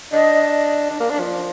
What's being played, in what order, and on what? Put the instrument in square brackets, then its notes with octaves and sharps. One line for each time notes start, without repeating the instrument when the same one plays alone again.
[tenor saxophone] D4 [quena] D#5
[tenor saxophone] D4
A#3
D4
F3